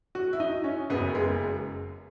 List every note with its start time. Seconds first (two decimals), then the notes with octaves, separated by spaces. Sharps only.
0.15 F#4
0.33 E4
0.40 D#4
0.64 C#4
0.90 F#1 F#2 C#3 B3
1.15 G#3